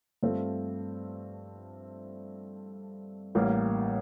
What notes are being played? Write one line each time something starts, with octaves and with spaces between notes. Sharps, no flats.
G2 F3 A3 C4 F4
A1 A2 G3 A#3